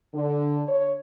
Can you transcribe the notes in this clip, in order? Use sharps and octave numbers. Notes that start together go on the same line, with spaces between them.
D3
C#5